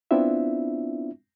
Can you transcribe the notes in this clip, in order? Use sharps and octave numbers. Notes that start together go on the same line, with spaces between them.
B3 C4 D4 E4 F4 E5